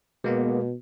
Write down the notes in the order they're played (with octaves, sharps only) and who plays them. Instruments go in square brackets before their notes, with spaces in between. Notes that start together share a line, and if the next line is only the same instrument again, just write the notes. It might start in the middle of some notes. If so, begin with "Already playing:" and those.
[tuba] B2 [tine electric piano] G#3 A#3 B3